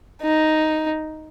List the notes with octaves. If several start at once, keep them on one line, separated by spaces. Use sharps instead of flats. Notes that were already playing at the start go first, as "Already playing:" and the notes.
D#4